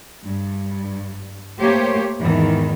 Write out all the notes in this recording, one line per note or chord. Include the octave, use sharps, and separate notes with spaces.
G2
A3 A#3 G4 C5 C#5
E2 G#2 D#3 E3